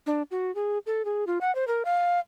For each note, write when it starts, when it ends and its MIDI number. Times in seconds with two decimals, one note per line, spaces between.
0.06 0.22 62
0.31 0.53 66
0.55 0.78 68
0.86 1.05 69
1.05 1.24 68
1.27 1.38 65
1.41 1.54 78
1.55 1.67 72
1.67 1.83 70
1.85 2.20 77